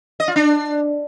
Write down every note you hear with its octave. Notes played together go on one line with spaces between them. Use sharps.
D#5
F4
D4